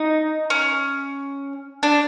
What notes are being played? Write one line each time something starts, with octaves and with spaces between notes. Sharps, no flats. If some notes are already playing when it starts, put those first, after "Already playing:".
Already playing: D#4
C#4
D4